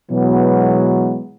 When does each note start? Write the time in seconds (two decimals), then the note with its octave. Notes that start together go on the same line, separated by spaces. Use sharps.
0.11 B2 E3 F#3 G#3 B3